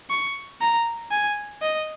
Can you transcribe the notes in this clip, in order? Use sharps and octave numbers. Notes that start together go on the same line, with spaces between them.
C#6
A#5
G#5
D#5